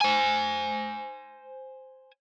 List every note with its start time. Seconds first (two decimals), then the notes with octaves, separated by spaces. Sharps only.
0.01 C5 G#5